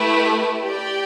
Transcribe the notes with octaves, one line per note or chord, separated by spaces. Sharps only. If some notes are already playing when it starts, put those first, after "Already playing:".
Already playing: A3 E4 G4 B4
G4 D5 G5